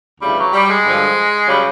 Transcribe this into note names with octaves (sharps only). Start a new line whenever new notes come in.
D2 C#3 E3 G3
F#3
G3
G#3
G2 D3 F3
C#3 F#3 G3